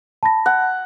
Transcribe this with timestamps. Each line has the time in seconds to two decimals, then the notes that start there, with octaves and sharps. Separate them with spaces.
0.23 A5 B5 A#6
0.46 F#5